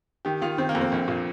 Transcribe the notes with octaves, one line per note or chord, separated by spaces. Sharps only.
D#3 G4
D#3 F4
D#3 C4
A#3
F2
C4
A#1
A#2